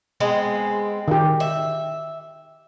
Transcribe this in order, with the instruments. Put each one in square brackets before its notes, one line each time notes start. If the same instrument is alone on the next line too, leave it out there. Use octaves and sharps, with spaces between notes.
[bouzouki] G#3 B3 C4
[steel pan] D#3 G4
[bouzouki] E5